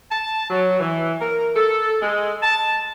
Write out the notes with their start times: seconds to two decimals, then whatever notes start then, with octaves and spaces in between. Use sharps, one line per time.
0.11 A5
0.50 F#3
0.80 E3
1.21 A#4
1.56 A4
2.02 G#3
2.43 A5